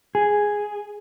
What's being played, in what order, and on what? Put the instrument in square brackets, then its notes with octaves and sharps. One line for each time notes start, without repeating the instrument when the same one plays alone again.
[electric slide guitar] G#4